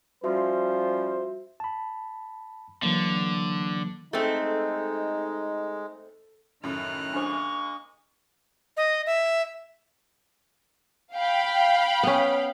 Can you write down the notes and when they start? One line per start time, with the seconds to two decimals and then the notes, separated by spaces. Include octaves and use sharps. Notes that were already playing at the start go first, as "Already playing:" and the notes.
0.24 F3 G3 C#4 F#4 C5 E5 C6
1.60 A5 B5
2.83 D3 E3 F#3 A#3
4.13 G#3 A3 C4 D#4 A4
6.64 F#2 A2 D#3 F6 F#6
7.14 G#3 A#3 D4 C5 C#6
8.77 D#5
9.06 E5
11.14 F5 G5 B5
12.03 B3 C#4